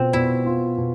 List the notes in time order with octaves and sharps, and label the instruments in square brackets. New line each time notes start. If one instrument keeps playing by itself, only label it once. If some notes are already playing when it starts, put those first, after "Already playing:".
Already playing: [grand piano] B2 F4 [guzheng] C4
[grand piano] B2 [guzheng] E4
[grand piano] F4
B2